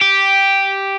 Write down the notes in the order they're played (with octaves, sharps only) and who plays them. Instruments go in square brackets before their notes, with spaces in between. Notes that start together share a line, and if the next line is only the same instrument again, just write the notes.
[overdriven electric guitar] G4